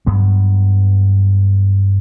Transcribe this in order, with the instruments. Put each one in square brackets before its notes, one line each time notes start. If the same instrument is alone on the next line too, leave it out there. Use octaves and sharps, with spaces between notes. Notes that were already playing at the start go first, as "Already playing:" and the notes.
[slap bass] G2 F#3 B3